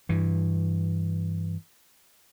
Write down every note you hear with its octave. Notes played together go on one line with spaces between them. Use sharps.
G2 E3